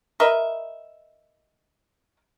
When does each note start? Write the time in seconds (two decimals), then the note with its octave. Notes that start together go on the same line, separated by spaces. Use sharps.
0.20 A#4 B4 D#5 E5